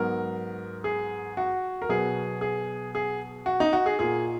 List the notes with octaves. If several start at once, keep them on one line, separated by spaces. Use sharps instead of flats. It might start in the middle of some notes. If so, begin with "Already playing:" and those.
Already playing: G#2 F#3 B3 A#4
G#4
F#4
A#4
B2 F#3 B3 G#4
G#4
G#4
F#4
D#4
F#4
G#4
A#2 A#3 G#4